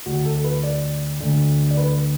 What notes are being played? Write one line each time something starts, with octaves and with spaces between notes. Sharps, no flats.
D2 D3 F#4
A4
B4
D5
D2 D3
D5
B4